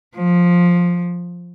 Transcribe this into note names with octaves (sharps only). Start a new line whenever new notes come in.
F3